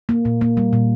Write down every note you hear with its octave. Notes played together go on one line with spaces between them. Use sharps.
A#3
A#2
A#3
G3
A#2